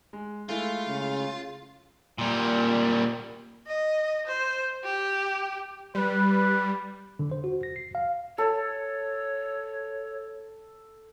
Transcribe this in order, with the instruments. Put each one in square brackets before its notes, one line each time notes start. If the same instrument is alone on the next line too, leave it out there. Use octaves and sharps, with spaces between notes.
[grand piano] G#3
[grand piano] G#3 A3 E4 [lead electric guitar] F4
[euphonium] C#3
[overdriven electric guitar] A#2 G3
[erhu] D#5
C5
G4
[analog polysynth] G3 [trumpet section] B4
[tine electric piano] D3
C5
F#4
A#6
C7
F5
[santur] A4 [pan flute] C#5